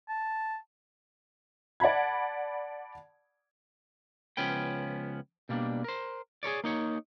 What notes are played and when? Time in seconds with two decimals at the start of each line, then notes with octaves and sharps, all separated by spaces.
0.09 A5
1.80 D5 F#5 A5 B5 G#6
4.37 C#2 F3 B3 C#4 B4 G5
5.49 B2 G3 A#3 C4 D4
5.84 A#4 C5
6.43 G#4 A#4 C#5 D5
6.64 A#3 D#4 C#5